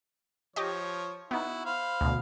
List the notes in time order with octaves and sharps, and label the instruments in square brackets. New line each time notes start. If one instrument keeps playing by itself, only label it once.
[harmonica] F3 C#5 [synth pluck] G4 D#5
[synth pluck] B3 D#4 [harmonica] E4 F#4
[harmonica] C5 F5 B5
[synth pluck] D2 B2